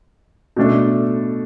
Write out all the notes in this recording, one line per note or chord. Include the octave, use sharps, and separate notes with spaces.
B2 A3 D4 A4